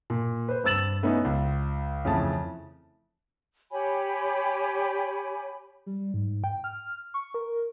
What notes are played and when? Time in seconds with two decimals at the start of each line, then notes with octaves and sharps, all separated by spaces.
0.10 A#2
0.48 B4 C5
0.64 G2 C4 E6 A6 E7 F#7
1.02 A3 B3 C#4 D#4 E4
1.25 C#2
2.05 F2 C#3 E3 A3 A5
3.71 G4 C#5 G#5 B5
5.86 G3
6.14 G#2
6.44 G5
6.64 F6
7.14 C#6
7.34 A#4